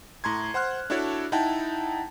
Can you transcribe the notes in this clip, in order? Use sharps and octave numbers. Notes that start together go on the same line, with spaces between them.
A2 A#5 C6 G#6
C5 F#5 C6 F6 F#6
D4 E4 F#4 A4 C#5 D5
D#4 E4 F#5 G5 A5